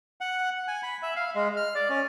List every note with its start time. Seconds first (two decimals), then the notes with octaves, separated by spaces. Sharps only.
0.21 F#5
0.68 G#5
0.83 B5
1.03 E5
1.16 F5
1.35 G#3
1.57 F6
1.75 D5
1.89 C#4